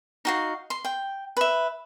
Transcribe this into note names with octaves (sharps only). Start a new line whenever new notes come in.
D#4 F#4 F5
C6
G5
B4 E5